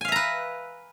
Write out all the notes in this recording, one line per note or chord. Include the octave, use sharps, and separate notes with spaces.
B4 E5 F5 G#5 A#5